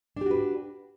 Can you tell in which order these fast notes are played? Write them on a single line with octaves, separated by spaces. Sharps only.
D4 G4 F#4 B4